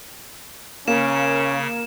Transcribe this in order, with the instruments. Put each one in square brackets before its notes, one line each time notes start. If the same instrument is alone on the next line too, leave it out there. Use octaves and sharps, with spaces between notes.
[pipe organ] C#3 [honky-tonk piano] A#3 [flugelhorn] C#4 [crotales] E7